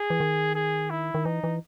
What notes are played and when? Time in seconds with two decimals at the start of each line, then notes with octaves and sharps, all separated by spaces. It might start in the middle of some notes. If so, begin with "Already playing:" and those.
Already playing: G#4
0.10 E3
0.20 D#3
0.55 G#4
0.90 E4
1.14 D#3
1.25 E3 D#4
1.44 E3